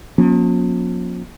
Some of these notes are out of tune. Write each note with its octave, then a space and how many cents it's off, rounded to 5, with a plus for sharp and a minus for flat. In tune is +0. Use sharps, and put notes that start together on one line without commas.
F3 +45 A#3 +40 C#4 +0